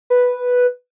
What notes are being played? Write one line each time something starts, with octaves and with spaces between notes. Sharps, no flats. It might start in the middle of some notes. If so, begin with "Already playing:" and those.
B4